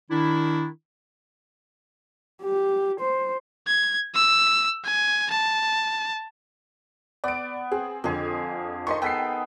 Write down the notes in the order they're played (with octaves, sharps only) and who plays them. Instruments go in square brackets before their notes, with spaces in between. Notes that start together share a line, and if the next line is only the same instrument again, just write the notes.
[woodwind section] D#3 D4 E4
[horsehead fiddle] G4
C5
[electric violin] G#6
E6
G#5
A5
[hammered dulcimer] B3 [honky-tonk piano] D5 D7
[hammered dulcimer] C4 [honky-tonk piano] G#4
[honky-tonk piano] F2 D3 [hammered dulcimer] F3 G#4
[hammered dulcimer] D#3 [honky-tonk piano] D#5 C6 C#6
[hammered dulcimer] B3 G#4 A4 [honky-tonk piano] G5 B6 C7